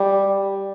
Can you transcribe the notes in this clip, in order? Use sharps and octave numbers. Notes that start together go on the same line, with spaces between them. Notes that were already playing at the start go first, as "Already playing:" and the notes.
Already playing: G3